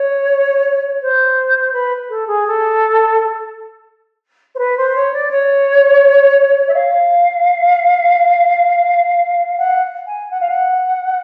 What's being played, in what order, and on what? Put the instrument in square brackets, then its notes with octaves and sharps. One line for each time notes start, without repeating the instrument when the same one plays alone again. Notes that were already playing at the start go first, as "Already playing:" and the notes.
Already playing: [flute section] C#5
C5
B4
A4
G#4
A4
C5
B4
C5
C#5
D5
C#5
E5
F5
F#5
G#5
F#5
F5
F#5